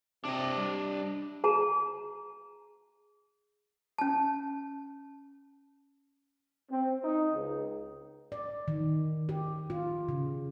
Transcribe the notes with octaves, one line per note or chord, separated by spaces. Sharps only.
C3 D4 D#5
G3
G#4 A5 A#5
C#4 A5
C4
D#4
C#2
D5
D#3
G4
F4
C#3